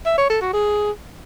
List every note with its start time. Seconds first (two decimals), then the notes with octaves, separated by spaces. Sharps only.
0.06 E5
0.18 C#5
0.30 A4
0.41 F#4
0.53 G#4